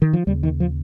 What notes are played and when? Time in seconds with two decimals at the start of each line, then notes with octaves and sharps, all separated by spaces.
0.02 D#3
0.13 F3
0.27 D#2 C#3 G3
0.43 D#3
0.60 F3